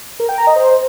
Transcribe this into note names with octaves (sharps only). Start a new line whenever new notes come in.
A#4
G5
A#5
D#5
C5